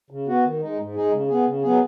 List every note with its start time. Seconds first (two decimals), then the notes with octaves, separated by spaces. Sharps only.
0.11 C#3
0.27 B3 F#4
0.44 D#3
0.62 G#3 D#4
0.78 G#2
0.95 G#3 D#4 G#4
1.12 C#3
1.28 B3 G#4
1.46 C#3
1.62 F#3 B3 G#4